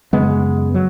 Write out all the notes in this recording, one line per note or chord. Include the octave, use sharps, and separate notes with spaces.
F#2 C#3 G#3 B3
F#3